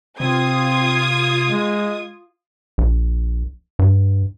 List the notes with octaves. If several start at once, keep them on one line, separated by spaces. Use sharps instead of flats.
C3 C4 F4 D#6 G#6
G#3
A#1
G2